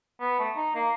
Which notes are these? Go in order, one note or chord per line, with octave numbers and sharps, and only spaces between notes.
B3
A3
D#4
A#3